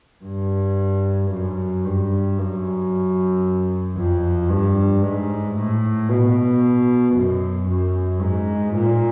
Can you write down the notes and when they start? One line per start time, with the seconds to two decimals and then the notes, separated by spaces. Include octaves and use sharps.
0.25 G2
1.32 F#2
1.85 G2
2.38 F#2
3.96 F2
4.49 G2
5.03 G#2
5.56 A2
6.09 B2
7.15 F#2
7.68 F#2
8.21 G#2
8.74 A#2